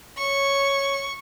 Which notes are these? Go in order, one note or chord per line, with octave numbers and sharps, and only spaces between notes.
C#5 C#6